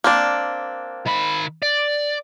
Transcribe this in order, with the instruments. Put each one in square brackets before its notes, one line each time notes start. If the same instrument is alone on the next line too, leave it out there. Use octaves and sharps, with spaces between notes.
[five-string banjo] A#3 C4 D4
[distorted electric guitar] D#3 B5
D5